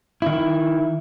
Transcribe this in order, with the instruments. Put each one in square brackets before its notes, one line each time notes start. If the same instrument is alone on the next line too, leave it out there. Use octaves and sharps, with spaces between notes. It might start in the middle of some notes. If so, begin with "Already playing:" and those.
[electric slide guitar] D#3 E4